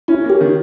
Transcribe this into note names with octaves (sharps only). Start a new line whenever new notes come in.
C#4 E4
A#3
G4
D#3